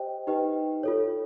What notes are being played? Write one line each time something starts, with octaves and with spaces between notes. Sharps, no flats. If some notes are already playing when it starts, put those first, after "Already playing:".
Already playing: G4 C5 D#5 G5
D#4 G4 B4 D#5 G5
F4 A4 C#5